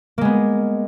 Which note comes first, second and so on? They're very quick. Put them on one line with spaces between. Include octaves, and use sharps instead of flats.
A#3 G#3 B3